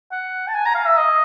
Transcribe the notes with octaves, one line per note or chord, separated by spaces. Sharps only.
F#5
A5
G#5
A#5
F5
E5
D#5